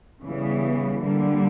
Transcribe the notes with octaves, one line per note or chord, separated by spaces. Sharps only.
C#3 E3 G3 B3
D3 G3 A#3